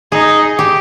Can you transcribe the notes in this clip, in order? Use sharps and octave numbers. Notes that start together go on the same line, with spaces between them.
D#4 G#4
G4